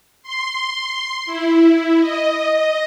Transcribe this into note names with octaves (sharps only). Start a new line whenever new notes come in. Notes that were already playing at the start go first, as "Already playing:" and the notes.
C6
E4
D#5